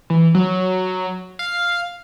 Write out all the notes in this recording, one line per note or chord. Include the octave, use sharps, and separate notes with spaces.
E3
F#3
F5